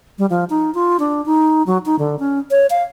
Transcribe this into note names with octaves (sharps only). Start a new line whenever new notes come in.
G3
F3
D#4
F4
D4
D#4
F#3
D#4
D3
C#4
C#5
F5